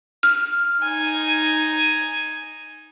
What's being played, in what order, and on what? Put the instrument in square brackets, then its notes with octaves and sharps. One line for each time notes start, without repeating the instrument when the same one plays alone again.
[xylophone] F6
[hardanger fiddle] D#4 G#5